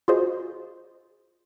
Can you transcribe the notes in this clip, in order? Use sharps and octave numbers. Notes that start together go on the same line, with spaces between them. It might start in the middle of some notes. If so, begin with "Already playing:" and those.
F4 F#4 G#4 C5 D#5